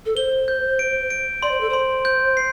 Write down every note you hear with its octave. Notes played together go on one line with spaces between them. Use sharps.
A4
C5 G7
G6
D7
D7
D5 C6
C5
A4
C5 C6
G6
C7